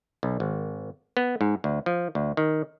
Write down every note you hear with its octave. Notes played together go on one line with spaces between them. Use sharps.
B1
G#1
B3
G#2
D2
F3
D2
D#3